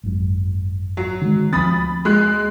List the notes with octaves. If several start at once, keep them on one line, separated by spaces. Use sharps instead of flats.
G#1 F#2
F#3
D3 D#3 G#3
D2 F3 C4 B5 D#6 A6
G#3 F#6